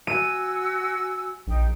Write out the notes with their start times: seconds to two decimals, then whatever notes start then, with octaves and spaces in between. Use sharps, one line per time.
0.07 F#4 G#5 E6 D#7
1.47 A#1 D#4 G5